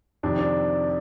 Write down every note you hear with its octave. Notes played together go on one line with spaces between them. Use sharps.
F2 C3 D#3 D4
D4